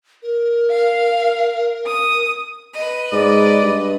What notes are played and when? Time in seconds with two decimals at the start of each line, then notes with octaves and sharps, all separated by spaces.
0.23 A#4
0.70 F5
1.87 D#6
2.73 B4 D#5
3.13 G#2 D5
3.63 G2